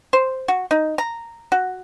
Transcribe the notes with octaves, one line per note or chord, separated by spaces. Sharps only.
C5
F#4
D#4
A#5
F#4